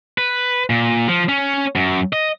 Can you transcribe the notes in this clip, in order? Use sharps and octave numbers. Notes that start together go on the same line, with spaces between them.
B4
A#2
F3
C#4
F#2
D#5